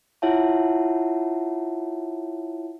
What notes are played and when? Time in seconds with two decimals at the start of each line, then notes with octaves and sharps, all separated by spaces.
0.22 E4 F4 C#5 E5 F#5 A5